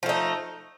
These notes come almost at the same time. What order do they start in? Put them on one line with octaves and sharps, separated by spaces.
F3 A3 D#4